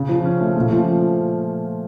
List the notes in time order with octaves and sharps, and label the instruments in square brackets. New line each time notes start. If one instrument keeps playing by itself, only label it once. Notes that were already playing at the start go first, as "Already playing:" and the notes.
Already playing: [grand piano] C#3
F3
C#4
A3
A#2
F3